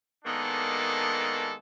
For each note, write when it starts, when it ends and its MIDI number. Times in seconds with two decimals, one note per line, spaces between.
0.25 1.53 51
0.25 1.53 56
0.25 1.53 58
0.25 1.53 59
0.25 1.53 62
0.25 1.53 69